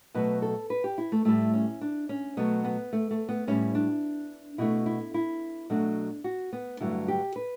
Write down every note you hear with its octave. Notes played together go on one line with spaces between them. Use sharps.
B2 F#3 A3 B4
A4
B4
G4
E4
A3
A2 G3 A3
C#4
D4
C#4
B2 F#3 A3 B3
B3
A3
A3
B3
A2 G3 C#4
D4
B2 A3 E4
E4
E4
B2 F#3 A3 D4
F#4
B3
G2 D3 F#3 A3 E4
G4
B4